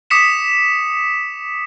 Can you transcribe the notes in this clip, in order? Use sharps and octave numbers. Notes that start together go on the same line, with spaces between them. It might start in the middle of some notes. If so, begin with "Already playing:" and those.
D6 D#6 B6 C#7 E7